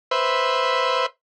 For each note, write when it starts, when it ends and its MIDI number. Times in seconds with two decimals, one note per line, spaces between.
0.11 1.06 71
0.11 1.06 72
0.11 1.06 76